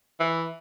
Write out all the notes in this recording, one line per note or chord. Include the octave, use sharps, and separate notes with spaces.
E3